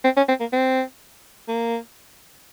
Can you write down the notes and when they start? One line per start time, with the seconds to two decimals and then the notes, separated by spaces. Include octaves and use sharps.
0.04 C4
0.17 C#4
0.28 C4
0.40 A#3
0.52 C4
1.48 A#3